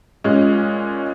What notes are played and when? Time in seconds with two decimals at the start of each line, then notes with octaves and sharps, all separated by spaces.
0.24 A#2 G#3 C#4